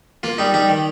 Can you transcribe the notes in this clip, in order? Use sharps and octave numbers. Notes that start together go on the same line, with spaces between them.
A#3 F4
G3 D#4
G3 D#4
D#3